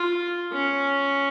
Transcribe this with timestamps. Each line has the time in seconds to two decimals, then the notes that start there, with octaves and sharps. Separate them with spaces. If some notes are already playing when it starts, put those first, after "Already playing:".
Already playing: F4
0.52 C#4